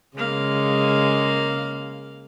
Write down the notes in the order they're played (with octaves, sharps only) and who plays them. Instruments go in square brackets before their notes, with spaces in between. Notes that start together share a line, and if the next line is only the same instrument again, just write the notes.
[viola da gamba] C#3 G#3 [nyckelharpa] A#3 F5